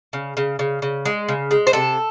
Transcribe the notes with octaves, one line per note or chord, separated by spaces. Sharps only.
C#3
C#3
C#3
C#3
G#3
C#3
G#3
C5
C3 A4